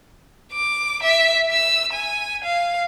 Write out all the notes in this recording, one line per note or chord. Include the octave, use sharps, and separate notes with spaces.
D6
E5
E6
G#5
F5